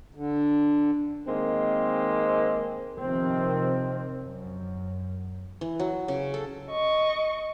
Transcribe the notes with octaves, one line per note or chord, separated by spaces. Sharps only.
D3
D#3 G#3 A#3 C4
C3 D#3 F3 C4
F#2
E3
F#3
C#3
A4
D#5 C#6